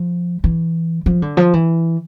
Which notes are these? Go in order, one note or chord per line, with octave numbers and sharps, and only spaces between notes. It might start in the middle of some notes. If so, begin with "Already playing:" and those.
Already playing: F3
E3
F3
D3
F3
E3